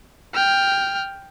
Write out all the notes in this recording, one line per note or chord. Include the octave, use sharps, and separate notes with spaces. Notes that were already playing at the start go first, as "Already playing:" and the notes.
G5 F6